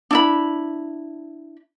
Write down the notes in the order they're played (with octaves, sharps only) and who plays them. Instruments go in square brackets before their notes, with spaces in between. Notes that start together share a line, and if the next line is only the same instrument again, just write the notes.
[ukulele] D4 E4 B5